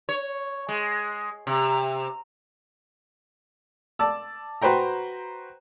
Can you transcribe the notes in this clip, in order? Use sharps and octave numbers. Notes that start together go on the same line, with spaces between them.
C#5
G#3
C3
D5 A5 E6
F#4 B4 C5 G5 A#5